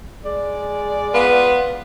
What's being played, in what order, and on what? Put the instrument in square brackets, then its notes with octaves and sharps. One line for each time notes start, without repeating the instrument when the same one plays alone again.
[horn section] G#3 G#4 D5
[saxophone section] B3 F4 B4